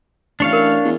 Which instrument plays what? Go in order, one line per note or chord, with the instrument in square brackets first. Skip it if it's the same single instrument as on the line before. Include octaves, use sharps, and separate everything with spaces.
[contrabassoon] A1 [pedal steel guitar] D4 C#5 F5
[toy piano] A#4
[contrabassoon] E2